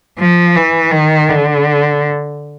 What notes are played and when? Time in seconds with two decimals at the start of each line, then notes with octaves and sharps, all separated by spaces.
0.19 F3
0.56 E3
0.91 D#3
1.29 D3